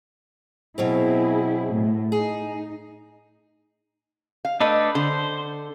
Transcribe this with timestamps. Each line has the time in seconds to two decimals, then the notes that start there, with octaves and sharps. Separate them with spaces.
0.78 B2 F#3 C4 E4 G#4
1.72 A2
2.12 D#4 G#4
4.45 F5
4.60 A3 D4 A4 B4 D#5
4.95 D3 C5